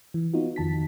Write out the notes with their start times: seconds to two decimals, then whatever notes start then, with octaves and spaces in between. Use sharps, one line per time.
0.14 E3
0.33 B3 D#4 F4 F#4
0.56 F2 D#3 A5 B6